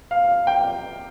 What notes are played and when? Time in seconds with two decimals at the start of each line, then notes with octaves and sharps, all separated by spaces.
0.11 F5
0.47 G5